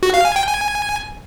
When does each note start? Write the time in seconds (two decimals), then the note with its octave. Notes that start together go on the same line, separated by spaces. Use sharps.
0.03 F#4
0.14 F5
0.25 G#5
0.36 G5
0.47 G#5